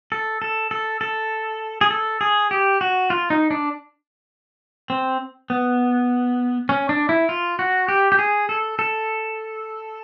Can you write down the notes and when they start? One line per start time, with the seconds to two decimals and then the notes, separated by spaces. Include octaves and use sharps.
0.12 A4
0.42 A4
0.71 A4
1.01 A4
1.81 G#4
1.91 A4
2.21 G#4
2.51 G4
2.81 F#4
3.10 F4
3.30 D#4
3.51 D4
4.90 C4
5.50 B3
6.69 C#4
6.89 D4
7.09 E4
7.29 F4
7.59 F#4
7.88 G4
8.12 G4
8.19 G#4
8.49 A4
8.79 A4